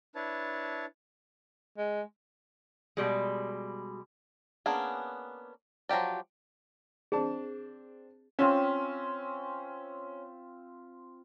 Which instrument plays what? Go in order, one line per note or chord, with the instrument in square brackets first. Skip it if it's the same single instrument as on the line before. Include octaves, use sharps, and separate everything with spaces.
[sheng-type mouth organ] D4 E4 B4 C#5 A5
[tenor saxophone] G#3
[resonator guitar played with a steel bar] B2 G3 G#3
[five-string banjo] A#3 B3 C#4 D4 G#4
F3 F#3 A3 G4 D5
[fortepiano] C4 D4 A5 [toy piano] G#4
[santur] C4 F4 E5 [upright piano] C#4